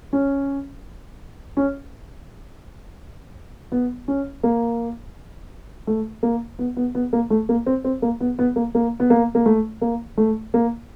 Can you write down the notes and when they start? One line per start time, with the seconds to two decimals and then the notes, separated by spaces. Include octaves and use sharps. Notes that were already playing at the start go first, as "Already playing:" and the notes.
0.13 C#4
1.57 C#4
3.72 B3
4.08 C#4
4.43 A#3
5.87 A3
6.23 A#3
6.59 B3
6.77 B3
6.95 B3
7.13 A#3
7.30 A3
7.49 A#3
7.66 C4
7.84 C4
8.02 A#3
8.20 B3
8.39 B3
8.56 A#3
8.75 A#3
9.00 B3
9.10 A#3
9.35 A#3
9.46 A3
9.81 A#3
10.17 A3
10.54 A#3